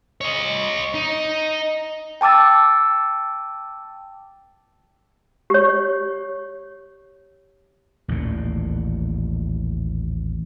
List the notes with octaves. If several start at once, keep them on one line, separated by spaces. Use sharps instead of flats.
C#5 D#5
D#4
G5 A5 D6 E6 A6
G4 C#5
A1 D#2 A#2